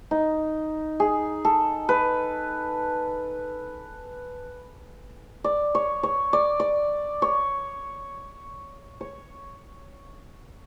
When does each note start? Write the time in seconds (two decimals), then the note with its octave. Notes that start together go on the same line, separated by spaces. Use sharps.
0.11 D#4
1.00 G#4
1.45 A4
1.89 B4
5.44 D5
5.75 C#5
6.03 C#5
6.33 D5
6.60 D5
7.22 C#5
9.01 C#5